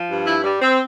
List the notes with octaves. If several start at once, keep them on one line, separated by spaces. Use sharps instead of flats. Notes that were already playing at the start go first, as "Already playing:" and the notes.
Already playing: F3
G2
E4
G3
C4